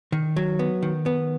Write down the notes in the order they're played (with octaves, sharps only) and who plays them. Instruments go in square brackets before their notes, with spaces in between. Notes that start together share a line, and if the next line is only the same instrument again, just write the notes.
[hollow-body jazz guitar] D#3
F#3
B3
D#3
B3